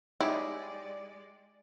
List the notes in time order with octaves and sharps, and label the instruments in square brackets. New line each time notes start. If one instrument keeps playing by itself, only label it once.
[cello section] G#3 D5 [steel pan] D#4 C#5 [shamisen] E4 [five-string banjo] G4 G#4